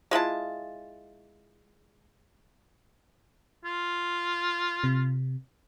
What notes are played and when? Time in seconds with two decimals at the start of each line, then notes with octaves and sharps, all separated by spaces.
0.11 G#3 E4 F4 A5
3.65 F4
4.84 C3